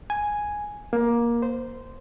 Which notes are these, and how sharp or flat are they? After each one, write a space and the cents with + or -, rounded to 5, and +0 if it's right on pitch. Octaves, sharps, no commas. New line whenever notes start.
G#5 +0
A#3 +15
C5 -15